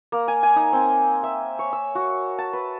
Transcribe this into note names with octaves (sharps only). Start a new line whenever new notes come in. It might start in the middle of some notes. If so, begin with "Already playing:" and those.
A#3
G#5
G#5
D#4
C4
E5
C#5
E6
F#4
A5
B4